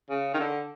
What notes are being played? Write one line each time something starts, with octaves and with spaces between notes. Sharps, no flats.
C#3
D#3
D3